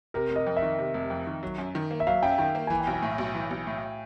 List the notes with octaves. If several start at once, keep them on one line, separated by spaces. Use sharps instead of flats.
C3 A#4
F1
D#5
F2
E5
D#3
C3
F1
F2
D#3
F#3
F#2
D#3
A#3
E5
F#3 F5
F#2 G5
D#3 G5
A#3
E3 G#5
G5
B1
G#5
A2
B1
E3
B1
A2